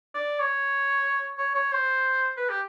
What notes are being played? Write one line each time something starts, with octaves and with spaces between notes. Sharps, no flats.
D5
C#5
C#5
C#5
C5
B4
G4